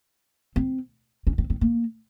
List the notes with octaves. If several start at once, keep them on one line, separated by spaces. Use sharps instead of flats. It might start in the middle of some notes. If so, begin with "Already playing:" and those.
C4
C#4
C4
C4
A#3